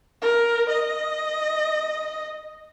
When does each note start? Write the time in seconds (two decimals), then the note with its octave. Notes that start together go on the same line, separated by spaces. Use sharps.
0.22 A#4
0.70 D#5